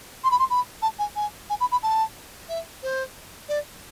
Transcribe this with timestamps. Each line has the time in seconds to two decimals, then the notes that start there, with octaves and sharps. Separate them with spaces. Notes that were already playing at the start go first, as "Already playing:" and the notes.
0.24 C6
0.31 B5
0.39 C6
0.50 B5
0.82 A5
0.99 G#5
1.15 G#5
1.50 G#5
1.60 B5
1.71 B5
1.83 A5
2.49 E5
2.83 C5
3.48 D5